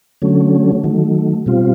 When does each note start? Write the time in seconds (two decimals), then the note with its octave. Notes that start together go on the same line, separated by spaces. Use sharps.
0.22 D3 F#3 A3 C#4
0.84 D#3 F#3 A3
1.46 B2 G3 C4 F4